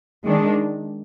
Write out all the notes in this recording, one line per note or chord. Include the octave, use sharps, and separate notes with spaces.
D#3 G#3 D4